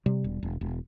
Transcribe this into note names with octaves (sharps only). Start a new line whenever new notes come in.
C3 G3
E1
E1
E1